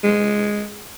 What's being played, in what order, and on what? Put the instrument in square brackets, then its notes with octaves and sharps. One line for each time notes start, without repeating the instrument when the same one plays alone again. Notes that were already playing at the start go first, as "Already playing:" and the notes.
[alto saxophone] G#3